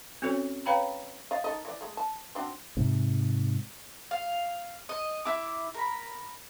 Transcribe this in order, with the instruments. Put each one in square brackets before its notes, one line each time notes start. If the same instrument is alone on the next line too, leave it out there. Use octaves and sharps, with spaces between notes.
[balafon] C4 C#4 F#4 A4 C5 C#5
B4 C#5 F5 G5 A#5 B5
[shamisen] D5 D#5 F5
D#3 A4 D#5
E3 F#4 D5
G#3 A3
A5
C4 D4 F#4
[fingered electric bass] G#2 C3
[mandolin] F5
D#5
E4 D6
A#4 B5